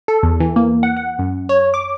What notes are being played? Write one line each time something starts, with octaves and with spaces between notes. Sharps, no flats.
A4
E2
E3
A#3
F#5
F#5
F#2
C#5
D6